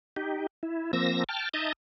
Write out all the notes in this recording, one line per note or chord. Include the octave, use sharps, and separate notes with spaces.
D#4 G4
E4
F3 A#3 C4 E6 A#6
G5 A5 F6
D#4 D#5 E5 A5 A#5 D#6